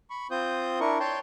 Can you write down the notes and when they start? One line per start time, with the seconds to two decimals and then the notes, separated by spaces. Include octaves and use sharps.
0.10 B5 C#6
0.31 C4 F4 C5 D#6 G6
0.80 D4 E4 A#4 C#6
1.00 C#5 G5 A5 C6